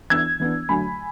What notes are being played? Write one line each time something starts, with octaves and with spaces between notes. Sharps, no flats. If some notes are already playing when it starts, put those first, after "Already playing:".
E3 B3 D4 E6 G#6
E3 B3 D4
D3 F#3 A3 G#5 B5